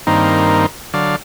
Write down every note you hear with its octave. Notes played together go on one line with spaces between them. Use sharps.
G2 D#3 A#3 C4 D#4
D3 F#3 D5 F5